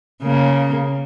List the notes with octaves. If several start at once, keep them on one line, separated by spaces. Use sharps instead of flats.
C#3 A#3